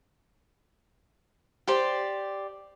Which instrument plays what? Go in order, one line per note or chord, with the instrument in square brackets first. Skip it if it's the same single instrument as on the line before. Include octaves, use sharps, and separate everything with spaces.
[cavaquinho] G4 C5 D5